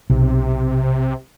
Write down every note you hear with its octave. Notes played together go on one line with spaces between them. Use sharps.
B1 C3